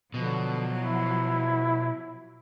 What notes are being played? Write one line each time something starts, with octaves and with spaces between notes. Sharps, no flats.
B2 D3 F3 F#3
E4